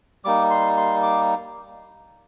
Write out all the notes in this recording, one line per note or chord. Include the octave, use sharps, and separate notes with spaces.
G3 A#3 D#4 D6
C6
C6
D6